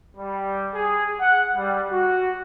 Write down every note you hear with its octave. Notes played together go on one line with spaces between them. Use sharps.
G3
G#4
F#5
G3
F#4